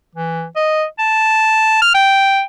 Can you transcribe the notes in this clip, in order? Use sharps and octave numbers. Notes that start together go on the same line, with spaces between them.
E3
D#5
A5
F6
G5